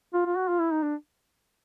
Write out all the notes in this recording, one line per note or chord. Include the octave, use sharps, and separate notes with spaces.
F4
F4
F#4
F4
E4
D#4
D4